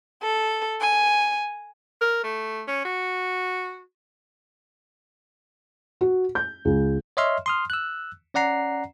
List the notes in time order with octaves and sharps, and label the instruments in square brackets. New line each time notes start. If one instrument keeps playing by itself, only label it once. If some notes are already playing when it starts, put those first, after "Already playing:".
[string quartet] A4
G#5
[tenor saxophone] A#4
A3
C#4
F#4
[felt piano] F#4
G6
C#2
[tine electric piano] C#5 D#5 E5 C6 F6
C6 D#6 F6
E6 F#6
C#4 D5 F#5 A#5 C7